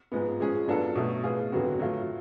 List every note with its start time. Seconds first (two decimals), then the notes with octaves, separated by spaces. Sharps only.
0.12 G#2 F3 G#3 B3
0.40 F3 G#3 C#4 G#4
0.68 F#3 B3 D4 F4 A4
0.95 B2 F#3 A3
1.24 A2 F3 B3 F4 G#4
1.52 F2 D3 F#3 B3 F#4
1.79 F#3 A3 F4